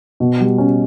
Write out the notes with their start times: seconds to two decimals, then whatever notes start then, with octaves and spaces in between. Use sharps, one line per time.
0.20 B2
0.40 G3
0.58 C#4